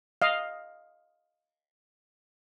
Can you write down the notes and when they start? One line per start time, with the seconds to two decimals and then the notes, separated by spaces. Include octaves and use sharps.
0.22 D#5 F5